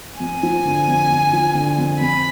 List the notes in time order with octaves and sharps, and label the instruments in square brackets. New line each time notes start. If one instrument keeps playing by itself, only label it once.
[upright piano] F2 [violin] G#5
[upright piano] F3
D3
F2
F2
F3
D3
F2
[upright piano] F2 [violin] B5